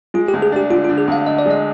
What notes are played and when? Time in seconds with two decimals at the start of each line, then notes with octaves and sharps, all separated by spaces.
0.14 G#3 F4
0.28 G4
0.33 D2
0.42 G#4
0.52 D4 G4
0.71 D3 F4
0.85 F4
0.89 D3
0.98 G#4
1.08 D2 F5
1.26 D3 D#5
1.39 D5
1.46 G#3 D#5